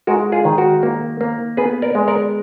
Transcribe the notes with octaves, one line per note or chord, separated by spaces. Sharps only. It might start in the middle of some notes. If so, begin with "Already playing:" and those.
G#3 F#4 A#4
F4 G#4
D#3
F#4 A#4
A#3
A#3
B3 G#4 B4
A#4 D5
G#3
A#4 D5